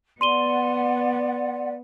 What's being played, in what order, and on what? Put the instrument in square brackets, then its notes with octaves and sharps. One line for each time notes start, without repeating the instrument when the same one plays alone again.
[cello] B3 [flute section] D5 F#5 [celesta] C6 D#7 G7